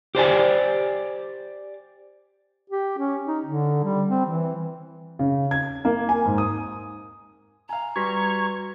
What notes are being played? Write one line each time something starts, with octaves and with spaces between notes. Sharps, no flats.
G4 C5 D5 G#5
G4
C#4
D#4
D3
G3
C4
E3
C#3
G#6
A#3
G#5
G#2
D#6
F5 G#5 A#5
G3 F#4 B4 C6 C#6 G#6 A#6 B6